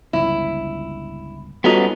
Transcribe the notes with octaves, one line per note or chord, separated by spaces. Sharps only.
G1 C#2 F3 E4
G3 B3 C#4 D#4 F4 F#4 A4